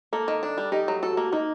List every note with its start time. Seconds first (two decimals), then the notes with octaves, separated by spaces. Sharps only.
0.13 A#3 A4
0.28 D#3
0.43 D4
0.58 G3
0.72 D#4 G4
0.88 F#3
1.03 F#4 A4
1.17 A#3
1.33 A#3 D#4